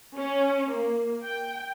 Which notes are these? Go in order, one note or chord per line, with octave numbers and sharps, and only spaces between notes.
C#4
A#3
G5